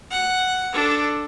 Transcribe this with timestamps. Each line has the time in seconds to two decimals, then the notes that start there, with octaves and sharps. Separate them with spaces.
0.11 F#5
0.73 D4 A4